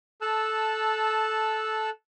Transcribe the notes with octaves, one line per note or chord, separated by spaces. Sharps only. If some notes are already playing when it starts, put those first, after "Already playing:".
A4 A5 E6 F#6